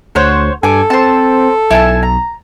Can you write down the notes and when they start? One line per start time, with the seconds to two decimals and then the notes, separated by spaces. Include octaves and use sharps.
0.15 D2 C5 C#5 F#5
0.63 G2 A4 G#5 D6
0.90 C4 C5 A5
1.71 B1 E4 G#5 A5
2.03 A#5